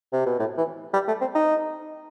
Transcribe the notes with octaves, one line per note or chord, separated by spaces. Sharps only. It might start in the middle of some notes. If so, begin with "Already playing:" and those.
C3
B2
A2
E3
G3
A3
C4
D#4